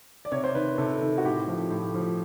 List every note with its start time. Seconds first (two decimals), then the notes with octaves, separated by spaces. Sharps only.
0.25 D5
0.32 C3 C#5
0.44 C5
0.55 D#3 B4
0.78 C3 A4
1.01 D#3
1.18 F#4
1.24 A2 G4
1.48 F3
1.71 A2
1.94 F3